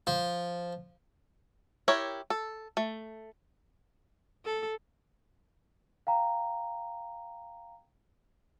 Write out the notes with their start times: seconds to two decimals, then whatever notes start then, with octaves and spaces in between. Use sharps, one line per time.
0.07 F3
1.88 E4 G4 A#4 C#5
2.30 A4
2.77 A3
4.45 A4
6.07 F5 G5 A#5